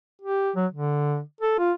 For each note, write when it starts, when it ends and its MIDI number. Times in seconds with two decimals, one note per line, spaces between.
0.22 0.51 67
0.56 0.66 54
0.72 1.20 50
1.41 1.55 69
1.59 1.72 65